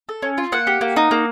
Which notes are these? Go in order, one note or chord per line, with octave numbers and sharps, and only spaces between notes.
A4
C#4
F4
A#3 F#5
G4
A#3
D#4
A#3